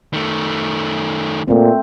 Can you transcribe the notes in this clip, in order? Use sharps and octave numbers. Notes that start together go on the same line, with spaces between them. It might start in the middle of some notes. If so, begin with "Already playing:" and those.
D#3 A3
A#2 A3 C4